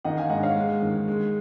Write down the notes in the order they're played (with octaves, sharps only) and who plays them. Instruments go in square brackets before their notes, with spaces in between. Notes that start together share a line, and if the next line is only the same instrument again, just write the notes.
[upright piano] D#3 D#5 F#5
F5 G#5
G#2 D#5 F#5
C#5 F5
G#3
D#3
G#3